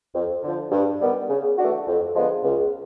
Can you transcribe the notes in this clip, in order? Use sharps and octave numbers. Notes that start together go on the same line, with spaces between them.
F2
D3 F3
G2
D#3 G3 B3
C#3
E3 A3 D4 F#4
F2
D3 F3 G#3 B3
C#2